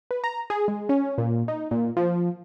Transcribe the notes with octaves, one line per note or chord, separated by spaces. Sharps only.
B4
A#5
G#4
G#3
C#4
A#2
D#4
A#2
F3